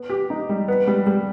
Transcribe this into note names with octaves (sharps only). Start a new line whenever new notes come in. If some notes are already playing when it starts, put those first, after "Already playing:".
Already playing: B3
G4
D#4
G3
B3
G3
G3